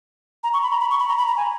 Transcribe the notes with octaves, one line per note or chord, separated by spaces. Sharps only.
A#5
C#6
B5
A#5
B5
C#6
B5
A#5
B5
A#5
G#5